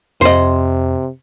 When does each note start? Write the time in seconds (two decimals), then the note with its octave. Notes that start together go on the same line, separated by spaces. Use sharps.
0.21 F2 C3 C5 D#5